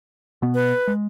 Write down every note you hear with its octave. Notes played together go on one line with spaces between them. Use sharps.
B2 B3
B4
G#3